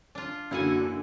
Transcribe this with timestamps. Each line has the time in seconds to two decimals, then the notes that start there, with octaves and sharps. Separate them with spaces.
0.15 D4 F4
0.51 F#2 D3 A#3 E4 F#4 F#5 G#5